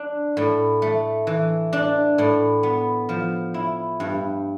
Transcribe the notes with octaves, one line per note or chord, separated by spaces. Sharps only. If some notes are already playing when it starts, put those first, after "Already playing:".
Already playing: D4
A2
A3
E3
D4
A2
B3
F3
E4
G2